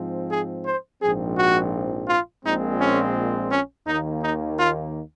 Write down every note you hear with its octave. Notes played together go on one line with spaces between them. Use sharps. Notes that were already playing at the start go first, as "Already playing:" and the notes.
Already playing: G#2 F3 C4
G#4
C5
A#1 G#2 F3 C4 G#4
F#4
F4
A#1 A#2 G#3 C4 D#4
C#4
C#4
D#2 D#3 A#3 D#4
D#4
F4